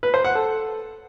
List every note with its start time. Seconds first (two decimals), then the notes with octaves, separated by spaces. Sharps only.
0.03 B4
0.14 C5
0.25 F#5
0.35 A4